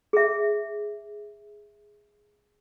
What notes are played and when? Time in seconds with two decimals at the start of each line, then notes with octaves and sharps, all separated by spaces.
0.13 G#4 E5